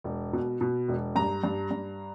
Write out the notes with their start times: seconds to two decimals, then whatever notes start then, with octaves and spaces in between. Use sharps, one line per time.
0.04 E1
0.33 B2
0.61 B2
0.88 E1
1.16 G2 A#5
1.44 G2
1.71 G2